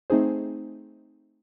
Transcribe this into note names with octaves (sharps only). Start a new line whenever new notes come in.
A3 C4 D#4 G#4 C5